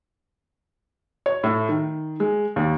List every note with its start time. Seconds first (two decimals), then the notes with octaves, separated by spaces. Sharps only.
1.26 C#5
1.43 A2
1.69 D#3
2.20 G#3
2.56 D#2